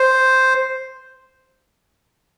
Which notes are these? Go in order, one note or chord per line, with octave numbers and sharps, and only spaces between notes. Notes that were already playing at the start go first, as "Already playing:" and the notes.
Already playing: C5